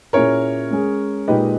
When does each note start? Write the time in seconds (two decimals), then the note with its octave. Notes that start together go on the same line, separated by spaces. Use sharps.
0.13 A#2 A#3 C#4 E4 G#4 A#4 C#5
0.71 G#3 C#4 G#4
1.28 A#2 G#3 D#4 G4 B4 D#5